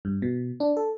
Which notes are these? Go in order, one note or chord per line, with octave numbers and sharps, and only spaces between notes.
G2
B2
D4
A4